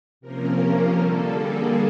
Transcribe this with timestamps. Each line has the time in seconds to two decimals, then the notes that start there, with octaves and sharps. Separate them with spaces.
0.21 C3 F3 A#3 C#4 A#4
0.58 A#4
0.93 D3 G3 A#3 A4
1.28 G#4